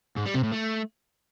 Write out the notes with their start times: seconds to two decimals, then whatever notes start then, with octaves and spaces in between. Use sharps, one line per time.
0.17 G#2
0.26 G3
0.35 C3
0.44 A2
0.53 A3